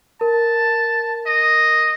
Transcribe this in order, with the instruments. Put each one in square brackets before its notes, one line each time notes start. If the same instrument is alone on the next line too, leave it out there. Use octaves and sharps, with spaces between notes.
[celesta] A#4 [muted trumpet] A5
[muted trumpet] D#5